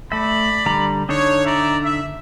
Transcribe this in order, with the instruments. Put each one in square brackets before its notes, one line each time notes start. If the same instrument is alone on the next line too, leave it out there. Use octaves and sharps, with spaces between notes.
[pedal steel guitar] A3 E5 [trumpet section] D5 B5
[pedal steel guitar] D3 G3 A#5
[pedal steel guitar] D3 D4 D#4 [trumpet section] C#5
[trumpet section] D5 E5 A#5
E5